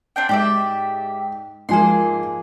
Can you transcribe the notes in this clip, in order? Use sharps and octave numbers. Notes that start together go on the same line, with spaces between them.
C4 D4 G5
G#2 G4 D5 E5
G#2 F3 A#3 G#4 C6